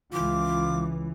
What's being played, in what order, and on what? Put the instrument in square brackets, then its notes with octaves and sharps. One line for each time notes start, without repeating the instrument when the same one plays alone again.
[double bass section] C#2 E3 [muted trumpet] F4 [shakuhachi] D6